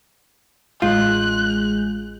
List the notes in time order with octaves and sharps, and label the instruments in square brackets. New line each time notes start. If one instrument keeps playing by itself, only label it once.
[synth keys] A1 G#3 G6 [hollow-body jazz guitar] F4 [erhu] F#6